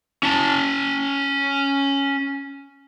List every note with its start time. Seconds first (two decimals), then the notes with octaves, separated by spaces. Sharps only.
0.23 C#4 A5